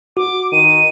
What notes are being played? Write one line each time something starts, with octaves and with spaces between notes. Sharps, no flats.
F#4 D6
D#3 D#7